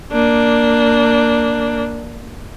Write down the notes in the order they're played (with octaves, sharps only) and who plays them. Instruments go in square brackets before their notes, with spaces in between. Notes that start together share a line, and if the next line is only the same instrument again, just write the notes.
[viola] A#3 D4